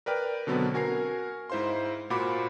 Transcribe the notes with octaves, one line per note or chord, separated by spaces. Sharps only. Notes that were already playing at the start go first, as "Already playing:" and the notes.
A#4 B4 D5 G5 F6
B2 D3 F#3 B3 C4 D4
F#4 A#4 G#5 F6 C7
G#2 E4 C5 F5 C6
A#2 F4 F#4 C5 B5 D6